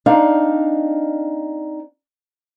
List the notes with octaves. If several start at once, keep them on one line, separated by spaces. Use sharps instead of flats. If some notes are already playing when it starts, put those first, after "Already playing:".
C4 D4 D#4 F5